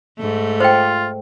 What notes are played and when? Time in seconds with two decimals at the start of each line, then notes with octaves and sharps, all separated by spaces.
0.18 G#2 A3
0.60 F4 C5 G5